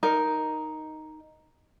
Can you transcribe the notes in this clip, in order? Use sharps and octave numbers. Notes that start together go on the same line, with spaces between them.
D#4 A#4